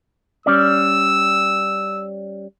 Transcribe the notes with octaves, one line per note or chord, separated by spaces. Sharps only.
G3 C#4 D5 E6